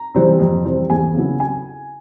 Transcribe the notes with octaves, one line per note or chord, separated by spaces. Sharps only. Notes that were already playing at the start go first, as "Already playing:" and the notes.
Already playing: A#5
C3 E3 G3 C4
F2
C3 E3 G3 C4
E2 G#5
C#3 F#3 B3 E4
G#5